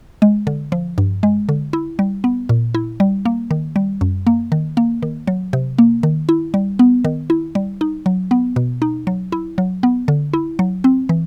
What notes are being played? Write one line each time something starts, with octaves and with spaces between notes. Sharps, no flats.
G#3
D3
F3
G2
G#3
D3
E4
G3
B3
A#2
E4
G3
A#3
D#3
G3
F#2
A#3
D#3
A#3
D#3
F#3
C3
A#3
D#3
E4
G3
B3
D#3
E4
G3
D#4
F#3
B3
B2
D#4
F#3
E4
F#3
B3
D3
E4
F#3
C4
E3